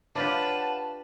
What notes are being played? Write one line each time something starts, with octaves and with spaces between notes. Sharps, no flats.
D4 F4 G4 B4 C#5 F5 F#5 A5